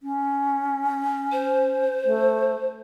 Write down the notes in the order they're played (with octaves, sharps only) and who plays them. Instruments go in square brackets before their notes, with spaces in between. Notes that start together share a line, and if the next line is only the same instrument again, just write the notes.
[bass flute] C#4
[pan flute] C5
[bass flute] A3